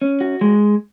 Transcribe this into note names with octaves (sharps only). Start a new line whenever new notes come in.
C#4
F#4
G#3